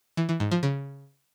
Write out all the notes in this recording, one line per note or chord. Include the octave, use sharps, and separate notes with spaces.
E3
E3
G#2
F3
C#3